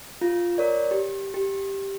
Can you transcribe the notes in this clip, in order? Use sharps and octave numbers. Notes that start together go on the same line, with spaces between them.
F4
A#4 C#5 D5
G4
G4